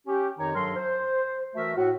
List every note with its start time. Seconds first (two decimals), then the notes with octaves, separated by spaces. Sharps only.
0.07 C#4 G4
0.38 F2 D#3 D#4 G4 C#5 A#5
0.54 G2 F#3 A4 A#4 C6
0.76 C5
1.55 E3 A3 F#4 A#4 E5
1.75 A2 F#4